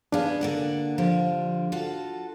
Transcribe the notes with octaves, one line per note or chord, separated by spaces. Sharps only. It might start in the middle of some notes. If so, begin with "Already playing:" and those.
B3 D4 G#4 F5
D3 A#3 F#5
D3 F3 G3
F4 F#4 A4